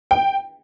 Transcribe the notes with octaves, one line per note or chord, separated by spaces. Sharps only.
G5